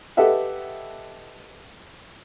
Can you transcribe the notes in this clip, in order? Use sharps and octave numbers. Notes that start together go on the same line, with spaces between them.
G4 A4 B4 D#5 E5 F#5